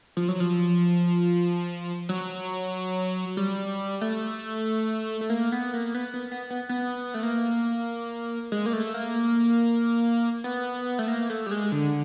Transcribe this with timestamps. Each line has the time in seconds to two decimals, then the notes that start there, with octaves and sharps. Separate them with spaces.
0.17 F3
0.28 F#3
0.40 F3
2.09 F#3
3.37 G3
4.01 A3
5.21 A3
5.30 A#3
5.52 B3
5.74 A#3
5.95 B3
6.14 B3
6.32 B3
6.50 B3
6.69 B3
7.14 A3
7.23 A#3
8.52 G#3
8.66 A#3
8.73 A3
8.94 A#3
10.44 B3
10.99 A3
11.08 A#3
11.30 A3
11.46 G3
11.51 G#3
11.72 D3